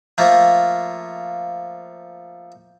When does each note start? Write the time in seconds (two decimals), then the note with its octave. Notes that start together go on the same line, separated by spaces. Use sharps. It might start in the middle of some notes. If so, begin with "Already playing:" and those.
0.18 F3 A3 A#3